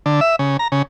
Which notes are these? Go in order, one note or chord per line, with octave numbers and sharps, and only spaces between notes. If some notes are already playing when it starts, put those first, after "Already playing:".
D3
E5
C#3
A#5
C#3